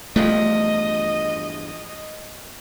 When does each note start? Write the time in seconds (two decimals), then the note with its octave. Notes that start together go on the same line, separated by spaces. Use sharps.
0.16 E2 G2 F3 A3 D#5